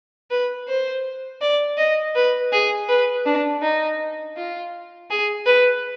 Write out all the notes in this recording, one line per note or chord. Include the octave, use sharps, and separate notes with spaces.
B4
C5
D5
D#5
B4
G#4
B4
D4
D#4
F4
G#4
B4